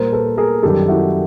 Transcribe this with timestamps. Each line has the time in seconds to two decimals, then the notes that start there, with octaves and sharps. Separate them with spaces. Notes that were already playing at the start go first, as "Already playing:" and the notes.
Already playing: A#2 G3 A#4 C5
0.12 A4 B4
0.37 G#4 A#4
0.63 F#2 D#3 G3 G4 A4
0.88 E4 F#4